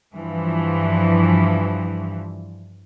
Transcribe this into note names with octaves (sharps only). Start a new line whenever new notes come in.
G2 E3 F3